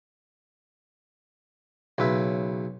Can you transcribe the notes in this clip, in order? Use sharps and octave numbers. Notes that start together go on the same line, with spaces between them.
B1 C#3 B4 E5